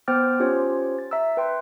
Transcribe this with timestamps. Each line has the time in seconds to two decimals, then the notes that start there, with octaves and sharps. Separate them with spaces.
0.08 B3 C5 G5 D6 F6 A6
0.40 C#4 F4 G4 C5 C#5
0.99 A6
1.11 E5 A#5 E6
1.37 B4 G5 C6